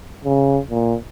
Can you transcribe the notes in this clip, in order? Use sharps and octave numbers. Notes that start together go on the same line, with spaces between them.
C#3
A#2